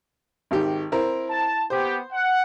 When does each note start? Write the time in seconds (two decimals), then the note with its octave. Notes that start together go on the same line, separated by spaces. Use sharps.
0.51 G#1 D#3 G4
0.92 C4 E4 A#4
1.29 A5
1.70 B3 G4 C5
2.12 F#5